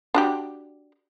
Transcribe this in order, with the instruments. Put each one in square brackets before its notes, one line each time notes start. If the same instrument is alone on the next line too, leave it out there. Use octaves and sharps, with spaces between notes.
[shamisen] D4 F#4 G4